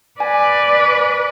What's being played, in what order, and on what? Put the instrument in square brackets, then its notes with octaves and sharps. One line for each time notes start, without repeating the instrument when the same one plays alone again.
[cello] B4 D5 [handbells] G#5